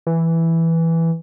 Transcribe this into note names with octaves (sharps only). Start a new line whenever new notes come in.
E3